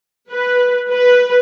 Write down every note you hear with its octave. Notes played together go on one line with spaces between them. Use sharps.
B4
B4